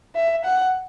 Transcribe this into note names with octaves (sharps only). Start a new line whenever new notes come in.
E5
F#5